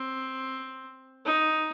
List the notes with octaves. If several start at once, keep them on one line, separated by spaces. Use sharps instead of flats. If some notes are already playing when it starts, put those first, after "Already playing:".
Already playing: C4
D#4